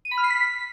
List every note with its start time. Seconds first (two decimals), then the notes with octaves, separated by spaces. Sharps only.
0.05 D#7
0.11 B5
0.18 F6
0.24 C7
0.30 B6